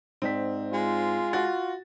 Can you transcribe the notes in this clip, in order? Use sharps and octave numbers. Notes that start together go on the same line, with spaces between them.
G#2 C4 D5 B6
G#3 F4
F#4 A6